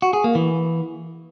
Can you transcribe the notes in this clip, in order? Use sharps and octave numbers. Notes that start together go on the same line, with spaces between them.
F#4
G#4
A#3
E3